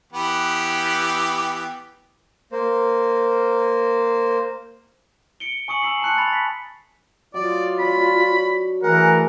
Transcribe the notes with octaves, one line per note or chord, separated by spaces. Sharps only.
E3 B3 G4
A#3 C5
C#7 D7 G7
G#5 C#6 D#6 C#7 F#7
G#5 A#5 E6 C7 F#7
A5 C6 F#6 C7 C#7
B5 A6 F7
B6
F#3 F4 D5 D#5
D4 C#5 B5
E3 A3 G#4 A#4 F#5